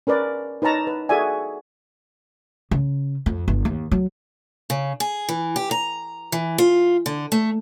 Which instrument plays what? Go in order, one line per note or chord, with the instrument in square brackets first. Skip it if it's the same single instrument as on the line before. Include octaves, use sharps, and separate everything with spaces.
[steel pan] C#4 A#4 B4 D5
D#4 B4 C#5 A5 A#5
B4
F#4 G#4 A4 D5 E5 G#5
[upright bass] C#3
F2
G1
D#2
F#3
[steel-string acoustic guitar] C#3
G#4
E3
G4
A#5
E3
F4
D3
A3